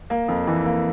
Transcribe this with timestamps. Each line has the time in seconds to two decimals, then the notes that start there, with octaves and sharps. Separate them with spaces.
0.10 A#3
0.28 F2
0.47 E3
0.65 A#3